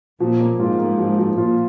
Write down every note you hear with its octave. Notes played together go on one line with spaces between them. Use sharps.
A#2 F3
A#3
G#2 F4
A#3
F3
F3
A#2 F4